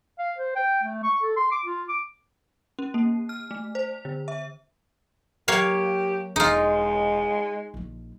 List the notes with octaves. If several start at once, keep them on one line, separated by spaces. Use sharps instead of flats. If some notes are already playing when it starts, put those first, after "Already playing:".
F5
C5
G5
A3
C#6
A4
C6
D6
F4
D6
C#4
A#3
F6
A3
C5
D3
E5
F#3 A#3 G4 C#5 F5
E1 F3 G#3 D#4 F4
A#1 F3